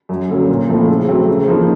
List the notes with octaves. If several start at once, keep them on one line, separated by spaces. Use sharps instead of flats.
F#2
D3 F#3 A#3 C#4
A#2
F3 A3 C4 E4
C#3
F#3 A3 C4
C#3
F3 A#3 D#4